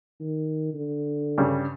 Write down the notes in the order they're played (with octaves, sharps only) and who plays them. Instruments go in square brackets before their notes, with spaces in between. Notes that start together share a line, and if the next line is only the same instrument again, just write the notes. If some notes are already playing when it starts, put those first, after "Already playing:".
[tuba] D#3
D3
[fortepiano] G2 C#3 G3